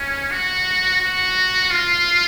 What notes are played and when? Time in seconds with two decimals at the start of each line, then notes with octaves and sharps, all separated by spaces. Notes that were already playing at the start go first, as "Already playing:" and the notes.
Already playing: C#4
0.32 F#4
1.01 F#4
1.70 F4